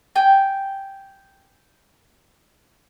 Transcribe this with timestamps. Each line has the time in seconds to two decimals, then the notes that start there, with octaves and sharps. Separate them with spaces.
0.15 G5 G#5